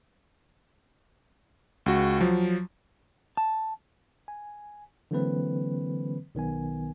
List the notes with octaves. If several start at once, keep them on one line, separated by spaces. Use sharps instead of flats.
C#2 F#4
F3 F#3
A5
G#5
D3 E3 F#3 A#3 C4 B4
B1 D#3 B3 G#5